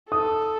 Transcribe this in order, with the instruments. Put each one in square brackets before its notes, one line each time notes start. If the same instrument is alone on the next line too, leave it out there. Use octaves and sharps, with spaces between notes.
[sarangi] A4 [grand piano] D#6